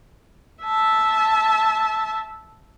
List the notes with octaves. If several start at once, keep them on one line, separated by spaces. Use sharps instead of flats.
E5 A5